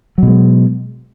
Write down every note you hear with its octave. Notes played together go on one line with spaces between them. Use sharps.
B2 F#3 G#3